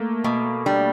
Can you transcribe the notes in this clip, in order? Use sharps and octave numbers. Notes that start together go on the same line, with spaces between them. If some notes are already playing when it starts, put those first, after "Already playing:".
Already playing: A3 A#3
B2 A#3
G3 D4